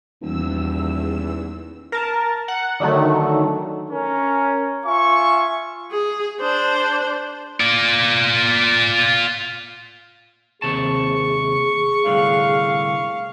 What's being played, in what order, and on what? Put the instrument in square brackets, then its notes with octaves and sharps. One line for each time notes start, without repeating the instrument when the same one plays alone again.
[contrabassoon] D#1 [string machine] E2 E6
[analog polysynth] A#4 A5
F#5
D3 D#3 F#3 A3
[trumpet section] C#4 A#4
F4 E5 G#5 C#6
[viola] G#4
D4 C5
[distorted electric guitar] F4 D5
[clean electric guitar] D#2 C3 A5 [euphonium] G#4 [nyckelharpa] C#6
[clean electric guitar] C2 A2 D3 [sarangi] F5